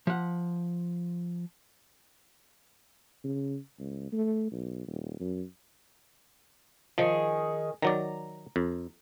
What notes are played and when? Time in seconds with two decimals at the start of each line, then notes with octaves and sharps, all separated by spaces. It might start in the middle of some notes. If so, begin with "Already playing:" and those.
0.07 F3 F#5
3.24 C#3
3.79 C#2
4.12 A3
4.51 B1
4.87 D#1
5.20 F#2
6.98 D#3 F3 G#4
7.82 D#3 F#3 D5 A#5
8.56 F2